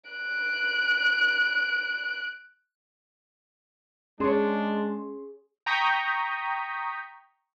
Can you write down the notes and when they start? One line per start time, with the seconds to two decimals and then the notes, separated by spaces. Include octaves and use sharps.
0.11 F#6 D7
4.20 G#3 C#4 D4 G#4 C#5 C6
5.66 G5 A#5 C#6 D#6 G6 B6